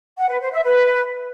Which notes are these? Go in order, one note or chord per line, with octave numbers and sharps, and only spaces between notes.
F#5
B4
C5
E5
B4